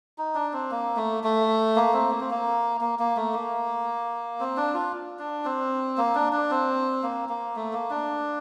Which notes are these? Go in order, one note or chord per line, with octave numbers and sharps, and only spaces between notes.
D#4
D4
C4
A#3
A3
A3
A#3
C4
A#3
C4
A#3
A#3
A#3
A3
A#3
C4
D4
F4
D4
C4
A#3
D4
D4
C4
A#3
A#3
A3
A#3
D4